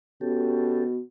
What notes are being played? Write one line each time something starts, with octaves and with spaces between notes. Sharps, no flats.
B2 C#4 G4 A4